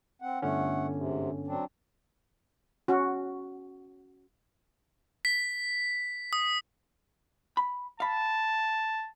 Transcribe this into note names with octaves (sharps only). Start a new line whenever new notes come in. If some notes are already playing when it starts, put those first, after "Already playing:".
C4 F#5
G1 D3 A3 C#4 F#5
G#2 C3
F#3 C4 D4
C#4 F#4
B6
D#6
B5
F5 A5 B5